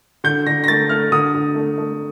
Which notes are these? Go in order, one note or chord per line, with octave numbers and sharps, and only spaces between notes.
D3 G6
D3 A#6
A#6
A3 A6
A3 F6
D3 D#6
D3
A3
A3